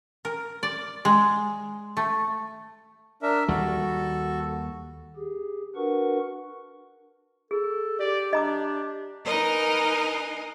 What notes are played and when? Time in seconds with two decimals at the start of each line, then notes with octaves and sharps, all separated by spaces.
0.25 A#4
0.63 D5
1.05 G#3
1.97 A3
3.23 D4 A#4 E5
3.48 D#2 G3 F#4 A4
5.16 G4 G#4
5.75 D4 F#4 A#4 B4 F#5 C#6
7.51 G#4 A4
7.99 G4 D5
8.33 D4 D#5 A#5 D6
9.24 D#4 A#4 B4 D#5 G#5